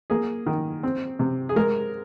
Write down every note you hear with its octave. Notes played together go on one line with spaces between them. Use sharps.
A#3 G#4
D#3
C4
C3
G#4
G#3 A#4